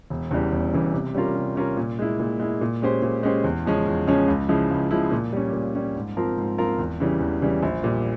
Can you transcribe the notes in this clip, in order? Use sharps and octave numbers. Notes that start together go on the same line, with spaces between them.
E1
E2 C#3 E3 G3
E1
E2 C#3 E3 G3
C3
G3 C#4 F4 A#4
C3
G3 C#4 F4 A#4
A#2
G#3 E4
A#2
G#3 E4
A#2
G#3 C#4 G4 C5
A#2
G#3 C#4 G4 C5
E2
C#3 F3 G#3 C#4
E2
C#3 F3 G#3 C#4
C#2
C#3 F3 G#3 E4
C#2
C#3 F3 G#3 E4
A#2
G3 C#4
A#2
G3 C#4
G#2
F3 C4 F4 A#4
G#2
F3 C4 F4 A#4
E2
C#3 E3 G3
E2
C#3 E3 G3
A#1
A#2 G3